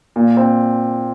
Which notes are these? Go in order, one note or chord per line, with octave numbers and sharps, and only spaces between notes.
A#2
C4